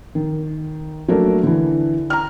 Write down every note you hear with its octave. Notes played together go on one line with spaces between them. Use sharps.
D#3
F#3 A3 A#3 D4 A#4
D3 E3
A#5 F6